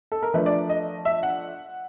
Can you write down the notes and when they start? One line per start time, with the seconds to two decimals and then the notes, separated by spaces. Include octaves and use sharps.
0.12 A4
0.23 A#4
0.34 F3 A3 D4 B4
0.46 D5
0.69 D#5
1.05 E5
1.23 F#5